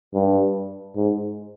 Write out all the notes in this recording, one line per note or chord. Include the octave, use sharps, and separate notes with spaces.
G2
G#2